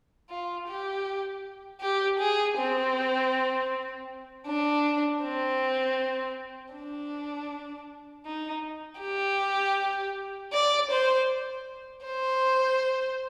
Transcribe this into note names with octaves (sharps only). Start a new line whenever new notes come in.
F4
G4
G4
G#4
C4
D4
C4
D4
D#4
G4
D5
C5
C5